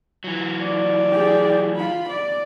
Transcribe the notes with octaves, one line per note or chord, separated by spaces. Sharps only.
E3 F#3
D5
G4 G#4
F4 B5
D5